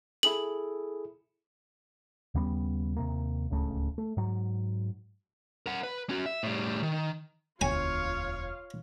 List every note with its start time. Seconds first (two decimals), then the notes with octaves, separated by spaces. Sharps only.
0.23 E4 G#4 A4 F#7
2.34 D#2 C#3 G3 B3
2.97 D#2 C3 A#3
3.50 D1 C#2 C#3 A3
3.98 A3
4.17 G#2 F#3
5.66 A#4 F#5
5.83 B4
6.09 C#4 F#4
6.26 E5
6.43 A2 G3
6.83 D#3
7.61 E1 D2 F4 C#5 F5 G#5